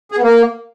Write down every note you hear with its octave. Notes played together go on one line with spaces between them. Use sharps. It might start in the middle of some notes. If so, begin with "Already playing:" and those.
G#4
B3
A#3